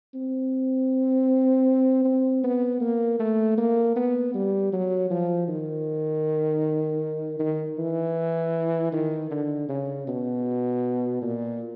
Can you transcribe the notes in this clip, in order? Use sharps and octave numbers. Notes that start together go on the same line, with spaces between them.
C4
C4
B3
A#3
A3
A#3
B3
G3
F#3
F3
D#3
D#3
E3
D#3
D3
C#3
B2
A#2